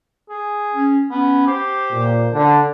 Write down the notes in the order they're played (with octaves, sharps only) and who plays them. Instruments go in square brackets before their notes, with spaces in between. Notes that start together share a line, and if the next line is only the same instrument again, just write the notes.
[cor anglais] G#4
[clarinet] C#4
[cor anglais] B3 [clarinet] C#4
[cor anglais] G4 [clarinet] C5
[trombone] A#2
[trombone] D3 [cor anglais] D4